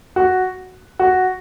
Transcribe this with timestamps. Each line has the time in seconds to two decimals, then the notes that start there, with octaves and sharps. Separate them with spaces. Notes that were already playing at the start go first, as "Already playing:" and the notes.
0.16 F#4
0.99 F#4